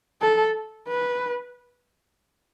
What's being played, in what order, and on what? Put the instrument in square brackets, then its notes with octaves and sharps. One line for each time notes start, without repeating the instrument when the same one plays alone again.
[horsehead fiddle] A4
B4